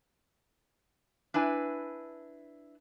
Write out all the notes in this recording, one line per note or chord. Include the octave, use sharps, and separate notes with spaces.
D4 E4 B4 G#5